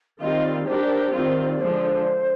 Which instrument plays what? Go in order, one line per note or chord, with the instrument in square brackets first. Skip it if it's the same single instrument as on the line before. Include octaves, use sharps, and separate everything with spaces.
[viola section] D#3 G3 C4 F4 [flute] D#5
[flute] D5
[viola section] G3 D4 G4 A#4 [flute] C5
[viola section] D#3 G3 C4 F4
[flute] D5
[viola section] D3 F3 G#3 D4 [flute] C5